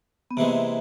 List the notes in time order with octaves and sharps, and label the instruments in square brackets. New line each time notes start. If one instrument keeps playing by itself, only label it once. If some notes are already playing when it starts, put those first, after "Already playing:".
[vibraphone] B3
[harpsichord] C3 E3 G#3 [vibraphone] A#3